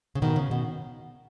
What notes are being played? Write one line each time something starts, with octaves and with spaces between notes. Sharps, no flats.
C#3
B2 D#3
C#3
B2